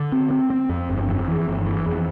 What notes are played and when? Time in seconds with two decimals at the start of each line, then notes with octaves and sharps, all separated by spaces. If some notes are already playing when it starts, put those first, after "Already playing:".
Already playing: D3
0.12 C4
0.31 C4
0.50 C4
0.69 F2
0.89 G1
1.08 F2
1.28 E3
1.47 G1
1.66 E3
1.86 F2